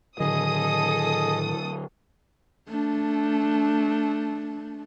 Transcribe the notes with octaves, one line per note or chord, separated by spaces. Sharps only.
A2 D3 D#3 F#3 G#4 A4 D#5 D#6
A3 D4